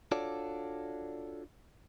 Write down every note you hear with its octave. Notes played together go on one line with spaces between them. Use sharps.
D4 F4 F#4 A4 C#5 D5